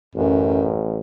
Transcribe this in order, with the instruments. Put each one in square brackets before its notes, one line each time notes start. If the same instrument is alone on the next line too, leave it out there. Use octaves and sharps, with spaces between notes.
[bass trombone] A1 [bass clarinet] F#2